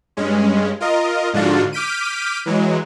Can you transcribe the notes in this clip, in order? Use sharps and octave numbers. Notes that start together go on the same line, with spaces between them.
G2 G#3 C#4
F4 A#4 D#5
G#2 D3 F3 D4 F4 F#4
D6 F6 G6 B6 D7 D#7
E3 F#3 G#3